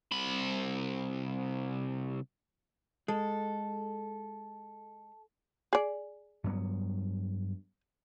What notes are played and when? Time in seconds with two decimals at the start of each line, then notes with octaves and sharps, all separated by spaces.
0.12 C2 B5
3.08 G#3 A4
5.73 G#4 D5
6.44 G2 F#3 B3